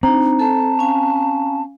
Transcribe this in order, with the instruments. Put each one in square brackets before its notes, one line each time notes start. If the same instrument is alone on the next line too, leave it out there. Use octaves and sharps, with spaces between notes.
[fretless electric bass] C4 [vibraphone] D4 D#4 [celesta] A#5
[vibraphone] A4 [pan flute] A5
[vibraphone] C#4 F5 G#5